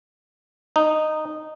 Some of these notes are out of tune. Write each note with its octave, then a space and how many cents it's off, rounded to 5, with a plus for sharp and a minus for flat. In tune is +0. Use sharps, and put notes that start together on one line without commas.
D#4 -10